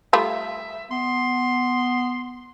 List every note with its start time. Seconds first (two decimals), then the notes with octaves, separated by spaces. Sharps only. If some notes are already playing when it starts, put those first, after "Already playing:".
0.13 G3 A3 F4 E5
0.91 B3 C6